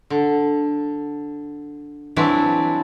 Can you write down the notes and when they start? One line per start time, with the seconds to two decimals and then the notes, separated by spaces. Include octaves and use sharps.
0.10 D3
2.16 E3 F#3 G3 C4 D4 E4